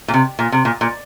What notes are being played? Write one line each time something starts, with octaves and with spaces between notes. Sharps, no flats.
A#2
C3
A#2
C3
A#2
A#2